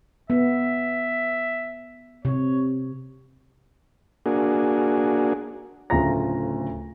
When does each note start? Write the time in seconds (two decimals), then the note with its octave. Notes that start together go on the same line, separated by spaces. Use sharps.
0.30 B3 E5
2.25 C3 C#5
4.26 A#3 D4 F#4 G#4
5.90 D1 D2 C#3 F4 A#5 A#6